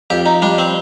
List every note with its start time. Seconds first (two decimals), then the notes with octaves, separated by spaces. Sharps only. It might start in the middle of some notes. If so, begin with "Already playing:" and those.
0.10 F2 G4
0.26 D#4
0.42 G3 D4
0.58 C4